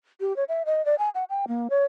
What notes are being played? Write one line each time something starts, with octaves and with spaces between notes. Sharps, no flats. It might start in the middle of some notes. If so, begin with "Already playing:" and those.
G4
C#5
E5
D#5
D5
G#5
F#5
G5
A#3
C#5